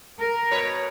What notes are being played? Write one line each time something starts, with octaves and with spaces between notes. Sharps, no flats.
A#4
B2 B4 C#5